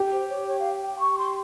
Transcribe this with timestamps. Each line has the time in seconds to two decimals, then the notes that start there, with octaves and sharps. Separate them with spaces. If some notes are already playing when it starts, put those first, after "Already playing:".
Already playing: G4
0.11 C5
0.29 C#5
0.47 C#5
0.59 F5
0.73 G5
0.87 G5
0.99 C#6
1.18 C6